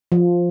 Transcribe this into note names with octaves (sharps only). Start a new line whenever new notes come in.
F3